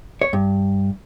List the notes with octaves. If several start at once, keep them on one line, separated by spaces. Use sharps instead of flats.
C#5
G2